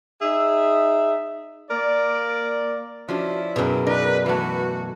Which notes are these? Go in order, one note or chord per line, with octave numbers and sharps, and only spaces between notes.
D#4 G#4 E5
A#3 A#4 D5
F3 C#4 D4 E4 F#4
F#2 B2 G#4
D#4 A#4 B4 D5
E3 A3 F#4 B4